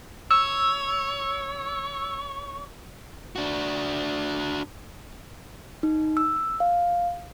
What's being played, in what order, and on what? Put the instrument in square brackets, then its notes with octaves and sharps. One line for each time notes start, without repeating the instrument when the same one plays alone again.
[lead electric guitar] C#5 [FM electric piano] E6
[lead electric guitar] D4 F#4
[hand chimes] D#4
E6
F5